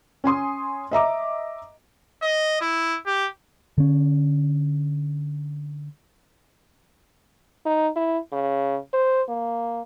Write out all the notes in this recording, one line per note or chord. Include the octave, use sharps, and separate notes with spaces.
C#4 G#5 C6 D#6
D#5 E5 A#5 D6
D#5
E4
G4
D3 C#4
D#4
E4
C#3
C5
A#3